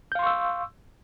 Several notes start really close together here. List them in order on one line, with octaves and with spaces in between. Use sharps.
G6 F5 C6 C#6 E6